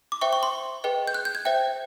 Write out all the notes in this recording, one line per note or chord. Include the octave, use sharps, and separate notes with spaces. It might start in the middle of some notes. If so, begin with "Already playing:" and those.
D6
C5 E5 G5 C#6
C#6
C6
G#4 B4 D#5 G5
G6
F#6
G6
G#6
C5 E5 G5